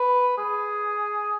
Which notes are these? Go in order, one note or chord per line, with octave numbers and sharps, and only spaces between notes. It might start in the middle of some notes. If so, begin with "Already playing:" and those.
Already playing: B4
G#4